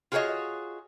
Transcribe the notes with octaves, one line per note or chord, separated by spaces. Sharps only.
F4 F#4 G#4 B4 C#5 D#5